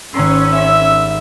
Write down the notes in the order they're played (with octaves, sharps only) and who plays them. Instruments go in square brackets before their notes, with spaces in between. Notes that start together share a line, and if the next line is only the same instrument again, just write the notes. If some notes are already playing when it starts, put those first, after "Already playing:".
[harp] G#1 A#5 C6 [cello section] C#4 [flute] E6
[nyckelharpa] E5